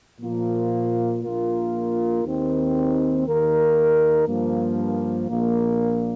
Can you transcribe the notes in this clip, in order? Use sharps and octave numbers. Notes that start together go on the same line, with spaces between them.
A#2 F3 A#3 F4
A#1 A#2 A#3 F4 A#4
D#2 D#3 C4
D#2 D#3 A#3 D#4 A#4
G2 F3 A#3
A#1 A#2 A#3